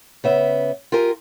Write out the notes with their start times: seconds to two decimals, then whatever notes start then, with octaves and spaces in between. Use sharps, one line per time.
0.24 C#3 B3 E5
0.92 F4 G4 A#4 G#5